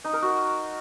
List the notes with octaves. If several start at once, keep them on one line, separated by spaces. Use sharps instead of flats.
D#4
A#4
F#4